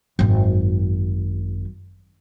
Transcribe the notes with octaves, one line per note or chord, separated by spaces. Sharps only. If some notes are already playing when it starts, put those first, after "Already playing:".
G#1 F#2